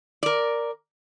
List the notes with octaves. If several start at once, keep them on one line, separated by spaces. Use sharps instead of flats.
A#4 D5